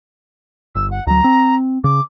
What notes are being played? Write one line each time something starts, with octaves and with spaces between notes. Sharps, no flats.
G1 E6
F#5
D2 F#3 A#5
C4
C#3 D6